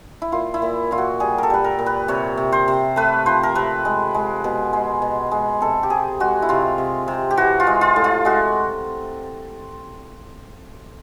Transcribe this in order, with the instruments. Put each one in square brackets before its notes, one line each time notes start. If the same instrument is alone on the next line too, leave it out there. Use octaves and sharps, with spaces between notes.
[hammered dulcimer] E4
A#2 F4
E4
A#2
A#2 F4
F#4
G3 G#4
A4 A#4
G3 B4
A#4
A#2
B4
C3 C#5
C3
C5
C3
A3 B4
F3 C5
A#4
C3 B4
G#3
G#3
B2
G#3
B2
G#3
C3 A4
G4
C3 G#4
G#3 F#4
E4
C3 F4
C3
C3
G4
E3 F#4
F4
G#3
F4
A2
F4
G#3 F#4